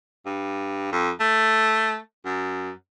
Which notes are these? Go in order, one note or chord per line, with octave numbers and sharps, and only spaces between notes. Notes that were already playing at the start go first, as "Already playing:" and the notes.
G2
F2
A3
F#2